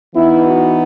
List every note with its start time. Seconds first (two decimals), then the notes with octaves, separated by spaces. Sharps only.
0.15 E3 B3 D#4 E4
0.46 F#4